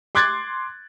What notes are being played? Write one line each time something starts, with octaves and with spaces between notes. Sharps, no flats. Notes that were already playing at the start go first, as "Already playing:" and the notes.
C6 D6 F#6 G#6 A6